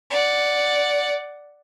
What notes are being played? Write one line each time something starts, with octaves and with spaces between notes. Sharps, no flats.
D5 F#5